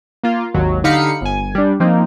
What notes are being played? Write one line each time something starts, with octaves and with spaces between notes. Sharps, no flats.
A#3 F4
G#1 D#2 F#3
D3 D#4 G4 F5 B5 C#7
G1 G#5
G3 D4
F3 A#3 C4 D#4